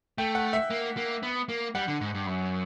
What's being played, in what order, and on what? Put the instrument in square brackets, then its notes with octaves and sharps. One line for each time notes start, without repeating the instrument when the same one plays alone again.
[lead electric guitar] A3 [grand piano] G5
[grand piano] F#5
E5
[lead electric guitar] A#3
A#3
B3
A#3
[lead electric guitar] G3 [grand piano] F#5
[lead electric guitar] D3
G#2
G2
F#2